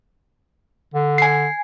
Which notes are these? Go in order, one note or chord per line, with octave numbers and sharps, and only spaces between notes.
D3
G#5 C7